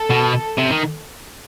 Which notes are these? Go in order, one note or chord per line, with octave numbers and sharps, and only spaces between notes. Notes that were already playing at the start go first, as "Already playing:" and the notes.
Already playing: A4
B2
C3
D#3